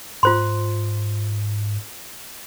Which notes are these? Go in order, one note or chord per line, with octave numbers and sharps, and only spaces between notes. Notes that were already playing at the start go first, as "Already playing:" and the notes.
G#2 F4 C5 C6